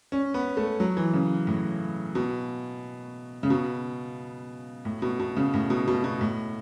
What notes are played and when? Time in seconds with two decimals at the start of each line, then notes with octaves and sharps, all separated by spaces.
0.12 C#4
0.34 B3
0.57 A3
0.80 F#3
0.97 E3
1.13 C#3
1.47 A2
2.15 B2
3.43 C#3
3.50 B2
4.85 A2
5.02 B2
5.20 B2
5.37 C#3
5.54 A2
5.70 B2
5.88 B2
6.04 B2
6.21 A2